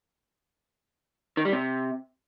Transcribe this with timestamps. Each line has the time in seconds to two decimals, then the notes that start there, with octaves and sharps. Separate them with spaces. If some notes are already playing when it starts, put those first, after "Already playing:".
1.37 D#3
1.45 G3
1.53 C3